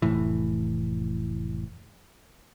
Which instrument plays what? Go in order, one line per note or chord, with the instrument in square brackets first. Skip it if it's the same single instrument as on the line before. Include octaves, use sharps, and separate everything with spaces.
[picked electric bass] F1 A2 E3